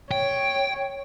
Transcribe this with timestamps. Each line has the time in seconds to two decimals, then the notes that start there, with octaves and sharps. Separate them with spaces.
0.11 C#5 G5